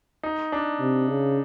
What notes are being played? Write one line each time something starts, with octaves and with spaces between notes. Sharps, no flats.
D#4
D4
C3
C#3